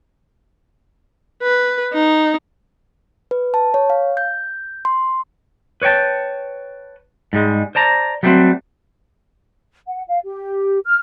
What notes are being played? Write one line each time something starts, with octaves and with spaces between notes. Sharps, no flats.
B4
D#4
B4
A5
C#5
F5
G6
C6
B4 C#5 D5 G5 A5
G#2 G3 G#3
C5 D5 A5 A#5
F#3 G3 A3 A#3 C4 F#4
F#5
F5
G4
F6